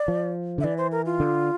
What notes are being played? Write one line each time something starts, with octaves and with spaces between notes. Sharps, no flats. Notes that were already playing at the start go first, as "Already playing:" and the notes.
Already playing: D5
F3
D3 E5
E3 D5
C5
A#4
F4
D3